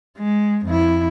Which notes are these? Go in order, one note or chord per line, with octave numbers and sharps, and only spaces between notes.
G#3
F2 E4